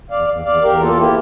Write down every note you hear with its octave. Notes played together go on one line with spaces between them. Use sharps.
E2 D5 F5
E2
E2 D5 F5
E2 G4 A#4
A#3 F4 A4
A#3 E4 G4